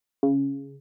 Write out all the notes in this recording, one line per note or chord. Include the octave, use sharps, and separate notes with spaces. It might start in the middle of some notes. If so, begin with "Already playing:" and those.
C#3